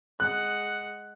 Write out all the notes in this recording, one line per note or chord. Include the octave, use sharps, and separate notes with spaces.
G#3 F#5 F#6